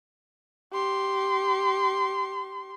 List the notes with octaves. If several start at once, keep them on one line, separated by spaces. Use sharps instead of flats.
G4 C6